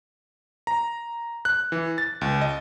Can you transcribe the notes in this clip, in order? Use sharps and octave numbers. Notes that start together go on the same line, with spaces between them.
A#5
F#6
E3
A6
C#2
D#5